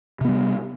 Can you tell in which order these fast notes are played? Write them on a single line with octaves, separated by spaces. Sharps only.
C3 B3 G3